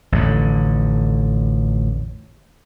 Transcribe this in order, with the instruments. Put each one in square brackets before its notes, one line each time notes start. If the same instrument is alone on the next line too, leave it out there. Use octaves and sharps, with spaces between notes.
[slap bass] A1 F2 D3